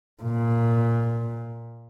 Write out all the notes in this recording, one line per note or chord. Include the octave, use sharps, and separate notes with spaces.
A#2